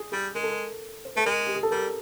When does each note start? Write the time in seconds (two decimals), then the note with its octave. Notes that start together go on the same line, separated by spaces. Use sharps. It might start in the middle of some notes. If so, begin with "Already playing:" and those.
Already playing: G#4
0.12 G3 G#4
0.35 G#3 A#4
0.43 A4
0.52 A#4
1.05 C5
1.16 A3 B4
1.26 G#3 A#4
1.47 G4
1.55 G#4
1.63 A4
1.71 G3 A#4